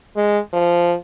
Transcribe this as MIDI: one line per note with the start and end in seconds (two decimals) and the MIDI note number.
0.16 0.38 56
0.53 0.94 53